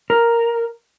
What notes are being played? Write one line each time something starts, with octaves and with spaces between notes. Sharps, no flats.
A#4